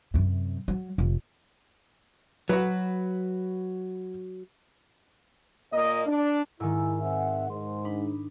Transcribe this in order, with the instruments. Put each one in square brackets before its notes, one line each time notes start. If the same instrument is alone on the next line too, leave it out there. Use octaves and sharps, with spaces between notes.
[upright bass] F#2 C3
F#3
F1
[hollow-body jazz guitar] F#3 [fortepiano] F#4 B4
[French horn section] A#2 A#3 D#5
D4
[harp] G#2 D#3 [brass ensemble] E4 [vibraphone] G#5 E6
[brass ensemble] C4 E5 F#5
[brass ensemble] G#2 [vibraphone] C6
[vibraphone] D4 D#4 [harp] B5